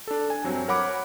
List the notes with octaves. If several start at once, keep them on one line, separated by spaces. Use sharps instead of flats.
D4 A4
G#5
G2 F#3 C4 C#5
A#4 C#5 F#5 B5 D6